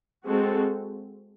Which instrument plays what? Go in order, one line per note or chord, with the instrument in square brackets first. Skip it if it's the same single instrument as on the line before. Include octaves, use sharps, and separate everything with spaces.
[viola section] G#3 C4 F#4 A4